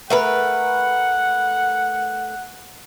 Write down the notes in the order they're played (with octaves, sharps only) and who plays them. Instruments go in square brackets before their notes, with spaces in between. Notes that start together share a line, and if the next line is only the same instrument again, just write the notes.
[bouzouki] A3 A#4 B4 [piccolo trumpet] F#5